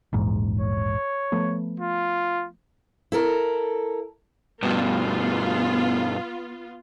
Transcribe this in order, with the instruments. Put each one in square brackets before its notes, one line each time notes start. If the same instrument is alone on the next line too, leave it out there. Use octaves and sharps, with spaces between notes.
[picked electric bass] A#1 E2 G#2
[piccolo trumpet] C#5
[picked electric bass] F3 A3 B3
[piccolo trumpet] F4
[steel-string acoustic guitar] E4 A4 A#4
[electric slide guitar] G2 B2 [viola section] B3 F4